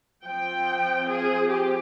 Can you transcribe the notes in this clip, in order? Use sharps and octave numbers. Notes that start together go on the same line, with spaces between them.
F3 C4 G5
G#4
G4